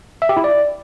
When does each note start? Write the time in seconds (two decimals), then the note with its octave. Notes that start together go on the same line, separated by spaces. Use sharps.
0.22 E5
0.29 G4
0.37 E4
0.44 D5